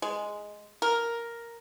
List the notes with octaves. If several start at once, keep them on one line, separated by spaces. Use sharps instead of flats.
G#3
A#4